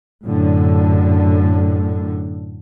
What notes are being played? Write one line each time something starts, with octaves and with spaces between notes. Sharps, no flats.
F#2 A2 D3